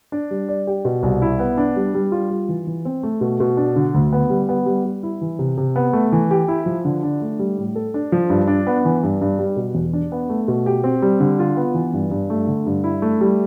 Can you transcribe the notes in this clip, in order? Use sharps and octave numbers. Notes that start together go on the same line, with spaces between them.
D4
G3
D5
G4
B2
C2
E4
B3
D4
G3
G3
F4
G3
E3
E3
C4
A3
B2
B2
D4
D3
D2
B3
G3
B3
G3
G3
E4
E3
C3
C3
B3
A3
E3
G4
E4
F3
D3
D4
A3
G3
A2
A4
D4
F3
G2
D4
B3
E3
G2
G2
G3
B2
E2
D4
B3
A3
B2
G4
C4
G3
D3
F4
B3
E3
G2
G2
A3
D3
G2
E4
A3
G3